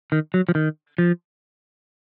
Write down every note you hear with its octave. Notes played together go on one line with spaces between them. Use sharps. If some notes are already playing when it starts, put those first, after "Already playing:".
D#3
F#3
F3
D#3
F3